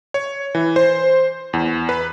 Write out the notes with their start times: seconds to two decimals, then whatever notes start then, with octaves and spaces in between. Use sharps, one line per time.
0.14 C#5
0.55 E3
0.76 C5
1.53 E2
1.89 B4